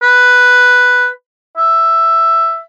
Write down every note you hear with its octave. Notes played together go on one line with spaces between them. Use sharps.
B4
E5